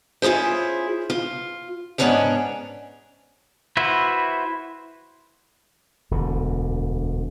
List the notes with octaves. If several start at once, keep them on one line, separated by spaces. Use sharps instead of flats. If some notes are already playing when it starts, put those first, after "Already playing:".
C#4 E4 F4 G#4 C5
F4
G#2 B3 C#4 D4 C#5 D5
E4 F#4 B4 C5 E5
E1 D2 D3